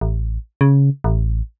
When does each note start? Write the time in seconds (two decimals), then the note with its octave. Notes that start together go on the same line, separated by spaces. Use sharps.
0.01 A1
0.61 C#3
1.04 A1